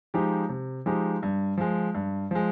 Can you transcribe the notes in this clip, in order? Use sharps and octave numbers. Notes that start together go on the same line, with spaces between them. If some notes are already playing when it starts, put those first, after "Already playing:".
F3 G#3 D#4 G4
C3
F3 G#3 D#4 G4
G2
F3 G#3
G2
F3 G#3